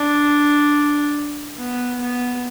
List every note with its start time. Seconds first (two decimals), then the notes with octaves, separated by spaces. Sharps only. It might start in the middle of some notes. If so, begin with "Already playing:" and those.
Already playing: D4
1.58 B3
2.00 B3